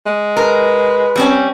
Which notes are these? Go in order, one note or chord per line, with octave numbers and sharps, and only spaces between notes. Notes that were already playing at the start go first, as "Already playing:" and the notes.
G#3
A#4 B4
G3 C4 C#4